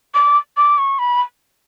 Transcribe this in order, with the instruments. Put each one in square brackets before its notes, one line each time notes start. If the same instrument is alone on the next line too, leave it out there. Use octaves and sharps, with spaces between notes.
[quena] D6
D6
C#6
B5